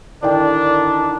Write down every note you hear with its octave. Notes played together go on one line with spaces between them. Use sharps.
D3 D#3 D4 E4 D5 G5